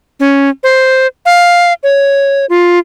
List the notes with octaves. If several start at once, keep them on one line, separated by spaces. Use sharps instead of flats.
C#4
C5
F5
C#5
F4